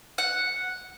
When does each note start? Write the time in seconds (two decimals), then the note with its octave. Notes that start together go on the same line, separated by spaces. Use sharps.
0.18 F#5